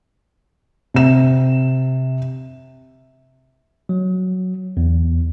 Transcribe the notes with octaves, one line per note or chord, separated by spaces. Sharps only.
C3 E7
F#3
E2